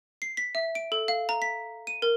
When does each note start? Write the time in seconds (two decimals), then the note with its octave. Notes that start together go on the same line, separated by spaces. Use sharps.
0.22 C7
0.37 B6
0.55 E5
0.75 D7
0.92 A4
1.08 F5
1.29 A#5
1.42 B6
1.87 D#7
2.02 A#4